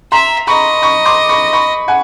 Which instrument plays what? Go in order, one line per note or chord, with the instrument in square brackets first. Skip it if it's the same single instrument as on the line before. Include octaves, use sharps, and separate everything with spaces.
[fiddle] E5 [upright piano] A#5 C6
[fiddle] D#5 [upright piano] B5 C#6
[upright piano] B5 C#6
C6 D6
B5 C#6
B5 C#6
F#5 G#5